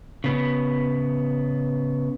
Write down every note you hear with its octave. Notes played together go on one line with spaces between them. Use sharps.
C#3 B3